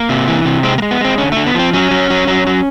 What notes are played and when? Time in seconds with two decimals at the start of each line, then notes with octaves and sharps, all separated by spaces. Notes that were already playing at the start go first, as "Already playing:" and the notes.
Already playing: A#3
0.09 C3
0.28 E3
0.45 C3
0.63 G#3 C4
0.78 A#3
0.82 G#3
0.91 B3
1.01 G#3 C4
1.18 D3 C#4
1.32 D3 A3
1.46 B3
1.54 F3 C4
1.73 F#3 C#4
1.91 F#3
2.10 F#3
2.27 F#3
2.47 F#3